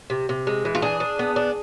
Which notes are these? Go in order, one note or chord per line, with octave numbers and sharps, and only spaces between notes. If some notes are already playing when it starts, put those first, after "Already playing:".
C3
C3
G#3
E3
F4
D4 G#4
D4
B3
D4